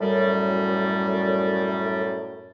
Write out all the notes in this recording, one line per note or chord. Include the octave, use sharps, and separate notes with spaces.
F#2 A2 G3